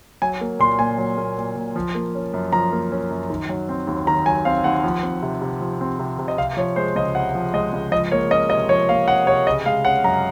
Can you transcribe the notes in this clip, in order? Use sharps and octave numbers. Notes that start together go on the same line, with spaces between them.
F#3 G#5
A#3
A#2 C6
A#2 G#5
F#3
A#3
A#2
A#2
F3
A#3
C#4
F#2
F3 A#5
A#3
C#4
F#2
D#3
F#3
C4
D#2
D#3 A#5
F#3 G#5
C4 F5
D#2 F#5
F3
C4
C3
C3
F3
C4
C3
C3
D#5
C3 F5
F3 C#5
G#3 C5
C#2 D#5
C3 F#5
F3
G#3 D#5
C#2
F3 D#5
A#3 C#5
C#4 D#5
C3 D#5
F3 C#5
A#3 F5
C#4 F#5
C3 C#5
C#3 D#5
G#3 F5
C#4 F#5
F#2 A#5